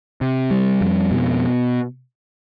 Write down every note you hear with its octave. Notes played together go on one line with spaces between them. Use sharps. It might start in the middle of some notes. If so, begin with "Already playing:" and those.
C3
G3
F2
B2